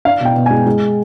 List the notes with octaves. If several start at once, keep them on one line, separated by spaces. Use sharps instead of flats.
D4 F5
B2 G5
B2
G#5
G#3
G#3